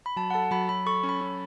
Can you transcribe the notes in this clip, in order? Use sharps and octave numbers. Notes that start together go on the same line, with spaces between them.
B5
F#3 A5
F#5
A4 A5
F#3 B5
F#3 B5
A4 C#6
C#4
B5
C#4